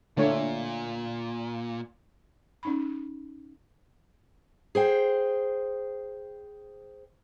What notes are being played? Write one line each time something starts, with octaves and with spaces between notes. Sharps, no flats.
A#2 D3 A3 C#5
C#4 D#4 B5
G#4 C5 G5